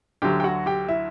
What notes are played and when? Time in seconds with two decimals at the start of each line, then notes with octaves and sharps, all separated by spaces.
0.22 D2 D3 F#3 G4 G5
0.40 G5
0.44 F#4 F#5
0.66 G4 G5
0.88 E4 E5